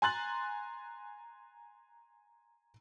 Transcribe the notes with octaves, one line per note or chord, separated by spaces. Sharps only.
G#5 A#5 C6 F#6 A6 F#7